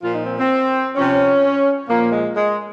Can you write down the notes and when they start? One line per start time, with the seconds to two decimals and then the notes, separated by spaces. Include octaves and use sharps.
0.03 A#2 F3 F4
0.14 D#4
0.26 C4
0.38 C4
0.96 C3 F3 C#4
1.89 A#2 F3 A#3
2.12 G#3
2.36 G#3